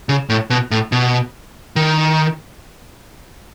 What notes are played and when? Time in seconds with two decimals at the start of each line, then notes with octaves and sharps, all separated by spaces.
0.09 C#3
0.29 A2
0.50 B2
0.71 A2
0.92 B2
1.76 D#3